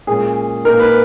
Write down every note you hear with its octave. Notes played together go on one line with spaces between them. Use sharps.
A#2 G#3 C#4 G#4
A#2 A#3 D#4 A#4
B4